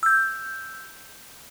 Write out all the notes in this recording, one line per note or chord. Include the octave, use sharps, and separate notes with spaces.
E6 G6